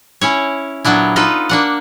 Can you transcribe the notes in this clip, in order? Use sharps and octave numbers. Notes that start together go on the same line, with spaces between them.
C#4 E4 C#5
A#2 F#3 B3 D4 E4
D#4 F4 A4 B4
A#3 D4 F#5